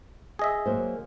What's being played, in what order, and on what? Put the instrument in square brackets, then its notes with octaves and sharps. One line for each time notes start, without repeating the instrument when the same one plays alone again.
[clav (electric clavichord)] G#4 D#5 E5
[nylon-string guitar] F#3 A#3 C5